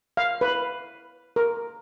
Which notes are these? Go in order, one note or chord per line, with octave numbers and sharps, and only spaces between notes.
F5
B4
A#4